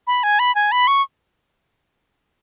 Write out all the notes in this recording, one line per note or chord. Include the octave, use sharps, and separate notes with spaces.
B5
G#5
B5
G#5
B5
C#6